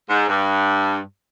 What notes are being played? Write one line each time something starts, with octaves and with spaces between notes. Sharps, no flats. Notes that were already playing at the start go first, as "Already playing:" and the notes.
G#2
G2